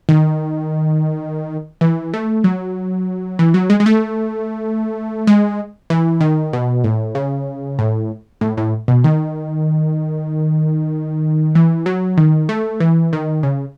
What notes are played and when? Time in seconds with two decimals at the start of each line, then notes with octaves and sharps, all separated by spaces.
0.09 D#3
1.81 E3
2.14 A3
2.44 F#3
3.39 E3
3.54 F#3
3.70 G#3
3.80 G#3
3.86 A3
5.27 G#3
5.90 E3
6.21 D#3
6.53 B2
6.84 A2
7.15 C#3
7.79 A2
8.41 A2
8.57 A2
8.88 B2
9.04 D#3
11.55 E3
11.86 F#3
12.17 D#3
12.49 A3
12.80 E3
13.13 D#3
13.43 C#3